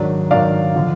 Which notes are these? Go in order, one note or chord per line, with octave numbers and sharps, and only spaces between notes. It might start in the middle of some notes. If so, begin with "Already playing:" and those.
Already playing: G#2 D#3 F#3 D4
G#2 D#3 F#3 D4 D5 F5
D3 F3